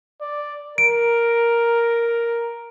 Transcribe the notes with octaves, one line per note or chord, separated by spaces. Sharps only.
D5
A#4 D7